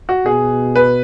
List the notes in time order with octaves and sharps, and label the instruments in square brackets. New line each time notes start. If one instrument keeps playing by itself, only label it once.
[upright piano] F#4
[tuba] B2 [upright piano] G#4
[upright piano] B4